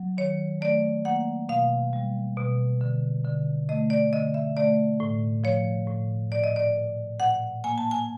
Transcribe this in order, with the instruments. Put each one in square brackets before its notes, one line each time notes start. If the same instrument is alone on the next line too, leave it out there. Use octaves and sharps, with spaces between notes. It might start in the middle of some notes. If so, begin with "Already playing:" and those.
Already playing: [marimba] F#3
D#3 C#5
A3 D5
A#3 F#5
B2 F5
G3
B2
D3
D3
A3 D#5
D5
D3 D#5
E5
A3 D5
A2
F3 C#5
A2
A#2 D5
D#5
D5
A#2
A#2 F#5
A#3 G#5
A5
G#5